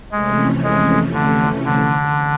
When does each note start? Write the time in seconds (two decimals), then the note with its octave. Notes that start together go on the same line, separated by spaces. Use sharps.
0.11 F2 C3 E3 G#3 A3 C#4
0.63 G#3
1.13 D3
1.65 D3